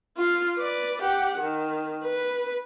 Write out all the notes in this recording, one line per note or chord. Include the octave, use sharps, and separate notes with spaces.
F4
B4 D5
G4 F#5
D#3
B4